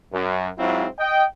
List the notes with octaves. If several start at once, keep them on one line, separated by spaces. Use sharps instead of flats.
F#2
G#2 F#3 C4 E4 F4
D#5 G5